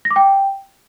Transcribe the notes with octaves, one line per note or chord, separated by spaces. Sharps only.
A#6
D6
G5